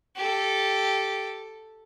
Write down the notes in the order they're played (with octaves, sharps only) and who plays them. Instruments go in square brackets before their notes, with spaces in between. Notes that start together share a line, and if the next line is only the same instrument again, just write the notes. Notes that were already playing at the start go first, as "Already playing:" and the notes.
[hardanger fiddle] G4 A4